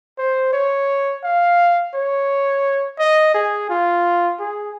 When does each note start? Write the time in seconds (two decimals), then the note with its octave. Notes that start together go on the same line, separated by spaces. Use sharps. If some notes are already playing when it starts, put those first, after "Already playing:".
0.18 C5
0.53 C#5
1.24 F5
1.94 C#5
2.99 D#5
3.34 G#4
3.69 F4
4.40 G#4